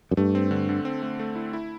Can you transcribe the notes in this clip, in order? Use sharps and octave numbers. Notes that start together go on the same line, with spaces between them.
F#2
G2 A3
C4
D3
D3
C4
A3
A3
E4
E4